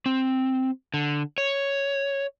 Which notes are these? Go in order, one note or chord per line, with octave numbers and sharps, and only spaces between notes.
C4
D3
C#5